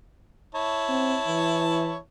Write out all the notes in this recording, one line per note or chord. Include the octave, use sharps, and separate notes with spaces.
E4 C#5 A5
C4
E3